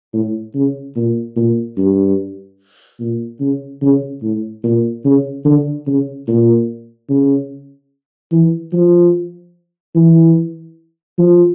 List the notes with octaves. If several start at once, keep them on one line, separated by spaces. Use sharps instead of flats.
A2
C#3
A#2
A#2
G2
A#2
C#3
C#3
A2
A#2
C#3
D3
C#3
A#2
C#3
E3
F3
E3
F3